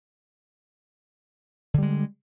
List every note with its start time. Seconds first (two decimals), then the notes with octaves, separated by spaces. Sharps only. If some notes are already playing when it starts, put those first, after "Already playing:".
1.74 D3
1.78 G3
1.82 G#3